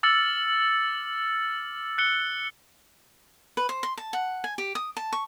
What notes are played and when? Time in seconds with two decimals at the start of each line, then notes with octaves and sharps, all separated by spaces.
0.03 D6 E6 F6 A6 C#7 F#7
1.98 F#6 C#7 G7
3.57 B4
3.69 C5
3.83 C6
3.98 A5
4.13 F#5
4.44 G#5
4.58 G4
4.75 D#6
4.97 A5
5.13 C#6